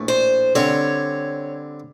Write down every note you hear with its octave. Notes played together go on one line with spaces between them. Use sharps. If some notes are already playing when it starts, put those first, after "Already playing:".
Already playing: A#1 A2 A3
C5
D3 G3 C4 C#5